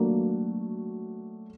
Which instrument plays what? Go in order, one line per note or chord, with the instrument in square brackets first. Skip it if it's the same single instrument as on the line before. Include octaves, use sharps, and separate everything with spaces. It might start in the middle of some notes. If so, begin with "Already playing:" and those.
Already playing: [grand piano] F#3 A3 D4 F#4 [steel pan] A#3